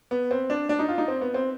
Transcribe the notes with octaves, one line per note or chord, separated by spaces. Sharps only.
B3
C4
D4
D4
D#4
F4
D#4
C4
B3
C4